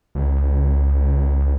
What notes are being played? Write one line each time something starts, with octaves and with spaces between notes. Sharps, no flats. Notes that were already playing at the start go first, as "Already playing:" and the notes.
C#2